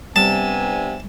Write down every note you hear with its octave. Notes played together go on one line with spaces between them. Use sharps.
C3 G3 B3 D4 G#5 A5